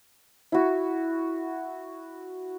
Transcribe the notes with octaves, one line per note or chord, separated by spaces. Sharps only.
E4 F#4